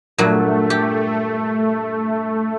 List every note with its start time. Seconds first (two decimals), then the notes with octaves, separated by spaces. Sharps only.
0.18 G2 A#2 F#3 A3
0.70 G4